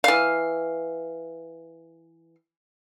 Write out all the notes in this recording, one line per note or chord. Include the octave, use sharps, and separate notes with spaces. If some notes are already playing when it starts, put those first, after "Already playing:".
E3 F5